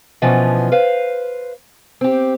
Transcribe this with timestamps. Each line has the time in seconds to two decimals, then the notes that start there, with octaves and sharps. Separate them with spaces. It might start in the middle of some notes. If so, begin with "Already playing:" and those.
0.22 B2 E3 F3 B3 C#4 D4
0.72 B4 C5 F5
2.01 C4 G4